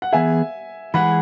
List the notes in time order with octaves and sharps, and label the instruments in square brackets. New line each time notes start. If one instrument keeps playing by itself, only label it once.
[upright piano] F#5
[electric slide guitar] E3 B3 G#4 [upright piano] E5 G#5
[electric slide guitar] E3 G#3 E4 G#4 [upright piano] F#5 B5